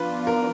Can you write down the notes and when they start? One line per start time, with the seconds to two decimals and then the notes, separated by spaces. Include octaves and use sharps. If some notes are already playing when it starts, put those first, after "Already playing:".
Already playing: F3 B3 D4 F4 B4
0.27 A#4